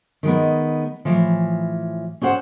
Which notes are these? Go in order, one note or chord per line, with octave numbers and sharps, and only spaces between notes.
D#3 G#3 B3
A2 E3 F3
C#4 G#4 C5 F#5